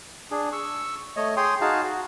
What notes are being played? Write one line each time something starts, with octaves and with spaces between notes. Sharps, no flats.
D4 G#4
C#6 E6
A3 C#5 D#5
G#4 C#5 G5 C6 D#6
D#4 F#4 G#4 F5 A5
F#4